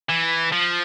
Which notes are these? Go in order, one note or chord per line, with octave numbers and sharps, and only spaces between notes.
E3
F3